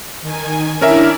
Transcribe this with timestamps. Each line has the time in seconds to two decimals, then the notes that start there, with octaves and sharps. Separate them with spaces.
0.22 D#3 G#5
0.81 C#4 D4 E4 A#4 D5 E5